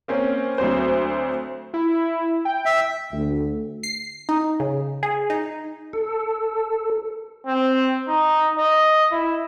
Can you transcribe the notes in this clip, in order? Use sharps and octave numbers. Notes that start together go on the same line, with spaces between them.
A#3 C4 C#4
D2 F#3 C4 C5
E4
G5
E5
D2
C7
D#4
C#3
G#4
D#4
A4
C4
D#4
D#5
E4